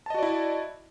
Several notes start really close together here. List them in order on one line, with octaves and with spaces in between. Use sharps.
A5 D#5 F#4 D5 E4